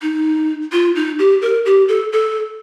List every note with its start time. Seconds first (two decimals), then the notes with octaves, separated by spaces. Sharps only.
0.02 D#4
0.72 F4
0.96 D#4
1.19 G4
1.42 A#4
1.65 G4
1.89 A4
2.13 A4